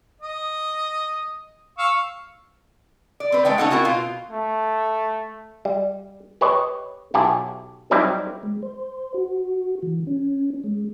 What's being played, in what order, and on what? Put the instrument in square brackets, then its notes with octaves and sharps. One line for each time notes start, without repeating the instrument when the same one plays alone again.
[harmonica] D#5
F5 C#6 E6
[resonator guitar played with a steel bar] D5
C4 B4
G#3 A3 D5 G5
A3 C#4 D#4 A4 F#5
C4 E4 F#4 A#4
B2 F4 F5
[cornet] A3
[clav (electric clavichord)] G3
G4 B4 C#5 D#5
B1 E4 F#4 G4 G#5 A5
F#3 G3 C4 D#4 E4 G4
[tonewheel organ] G#3
C5
F#4
E3
C#4
G#3